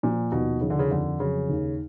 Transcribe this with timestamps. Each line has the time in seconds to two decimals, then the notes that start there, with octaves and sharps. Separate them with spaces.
0.03 A#2 F3
0.32 D#2 B2
0.61 C#3 F3
0.70 D3
0.79 C#3
0.91 F2 D3
1.20 C#3 F#3
1.49 D#2